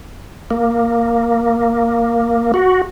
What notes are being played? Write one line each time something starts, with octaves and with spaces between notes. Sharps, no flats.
A#3
F#4